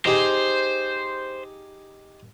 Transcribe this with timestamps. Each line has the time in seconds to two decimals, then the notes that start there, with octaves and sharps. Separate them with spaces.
0.06 D#4 G4 G#4 C5